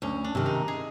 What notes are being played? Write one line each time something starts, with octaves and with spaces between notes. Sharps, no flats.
D2 C#4
D4
C3 D#3
D#4
G#4